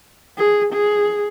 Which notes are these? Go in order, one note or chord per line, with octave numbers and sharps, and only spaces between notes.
G#4
G#4